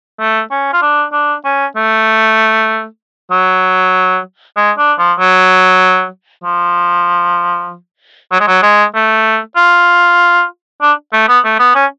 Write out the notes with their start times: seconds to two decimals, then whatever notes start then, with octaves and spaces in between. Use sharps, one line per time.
0.20 A3
0.51 C#4
0.73 F4
0.82 D4
1.12 D4
1.44 C#4
1.76 A3
3.31 F#3
4.57 G#3
4.78 D4
4.98 F3
5.19 F#3
6.44 F3
8.32 F#3
8.40 G#3
8.47 F#3
8.62 G#3
8.95 A3
9.56 F4
10.82 D4
11.13 A3
11.28 B3
11.45 A3
11.59 B3
11.75 C#4